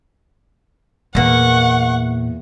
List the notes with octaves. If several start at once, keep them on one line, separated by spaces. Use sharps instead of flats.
E2 A#2 A#3 F#5 C#6